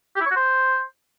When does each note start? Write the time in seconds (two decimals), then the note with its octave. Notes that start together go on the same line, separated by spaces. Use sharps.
0.16 G4
0.21 E4
0.26 C#5
0.31 F#4
0.36 C5